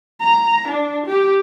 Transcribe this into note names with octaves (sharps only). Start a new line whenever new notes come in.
A#5
D4
G4